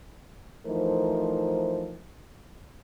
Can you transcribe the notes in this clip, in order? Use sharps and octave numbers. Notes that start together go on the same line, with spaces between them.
E3 F3 A3 D#4 A#4 C5